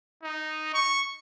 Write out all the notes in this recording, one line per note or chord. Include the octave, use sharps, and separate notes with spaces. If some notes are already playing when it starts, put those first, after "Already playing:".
D#4
C#6